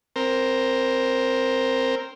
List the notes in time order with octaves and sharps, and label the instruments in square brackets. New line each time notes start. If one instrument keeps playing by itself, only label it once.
[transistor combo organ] C4 A#4